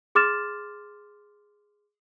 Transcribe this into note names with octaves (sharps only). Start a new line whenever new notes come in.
G#4 C6 D6 F6 A6 E7